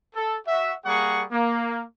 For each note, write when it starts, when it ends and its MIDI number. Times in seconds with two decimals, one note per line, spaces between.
0.16 0.36 69
0.48 0.74 66
0.48 0.74 76
0.86 1.25 55
0.86 1.25 58
0.86 1.25 68
0.86 1.25 70
0.86 1.25 78
0.86 1.25 85
1.32 1.84 58